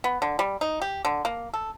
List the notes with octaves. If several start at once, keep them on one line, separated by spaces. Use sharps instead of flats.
B3
D3
G3
D#4
G4
D3
A#3
A4